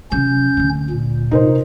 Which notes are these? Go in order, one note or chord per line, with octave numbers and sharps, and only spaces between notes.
C3 F#3 C#4 G6
D1 D3
A#2
C3 D#4 A#4 C5